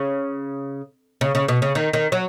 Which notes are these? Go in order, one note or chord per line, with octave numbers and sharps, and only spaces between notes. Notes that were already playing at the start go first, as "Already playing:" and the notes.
Already playing: C#3
C#3
C#3
B2
C#3
D#3
D#3
F#3